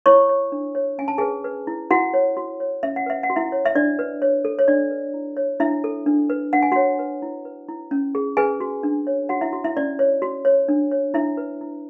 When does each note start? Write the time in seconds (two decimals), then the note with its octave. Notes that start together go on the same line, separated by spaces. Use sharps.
0.06 E4 C#5 C#6
0.29 C#5
0.52 D4
0.75 C#5
0.98 C#4 G#5
1.08 A5
1.18 G#4 B4 G#5
1.44 B4
1.67 E4
1.91 E4 F#4 F#5
2.14 C#5
2.37 F#4
2.60 C#5
2.83 C#4 E5
2.96 F#5
3.06 B4 E5
3.23 F#5
3.30 F#4
3.36 E4 E5
3.52 C#5
3.65 E5
3.75 D4 D5
3.99 B4
4.22 C#5
4.45 A4
4.59 C#5
4.68 D4 D5
4.91 B4
5.14 E4
5.37 C#5
5.60 D4 E4 E5
5.84 A4
6.06 D4
6.30 B4
6.53 D4 F#5
6.62 G#5
6.72 F#4 C#5 F#5
6.99 B4
7.22 E4
7.45 B4
7.69 E4
7.91 C#4
8.15 G#4
8.37 G#4 B4 G#5
8.60 F#4
8.83 D4
9.07 C#5
9.29 F#4 C#5 F#5
9.41 E4 E5
9.53 F#4
9.64 E4 E5
9.77 C#4 D5
9.99 C#5
10.22 F#4
10.45 C#5
10.68 D4
10.91 C#5
11.14 D4 E4 E5
11.37 B4
11.61 E4